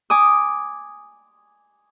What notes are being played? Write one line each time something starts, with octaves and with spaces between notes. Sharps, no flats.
G#5 D6 D#6